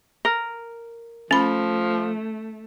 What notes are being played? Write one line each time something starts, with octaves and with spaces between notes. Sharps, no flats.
A#4
F3 A3 C#4 B5